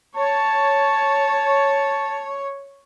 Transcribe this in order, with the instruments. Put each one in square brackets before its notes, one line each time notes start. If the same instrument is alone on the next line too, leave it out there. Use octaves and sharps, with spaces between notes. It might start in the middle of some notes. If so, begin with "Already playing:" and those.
[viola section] C#5 [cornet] A5